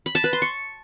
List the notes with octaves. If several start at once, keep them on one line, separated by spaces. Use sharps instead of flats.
B5
A5
B4
C6
C#6